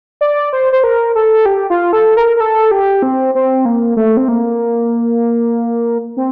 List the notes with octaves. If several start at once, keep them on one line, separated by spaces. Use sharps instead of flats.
D5
C5
C5
A#4
A4
G4
F4
A4
A#4
A#4
A4
G4
C4
C4
A#3
A3
C4
A#3
C4